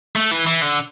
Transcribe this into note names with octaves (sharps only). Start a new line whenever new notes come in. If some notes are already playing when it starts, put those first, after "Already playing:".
A3
E3
E3
D3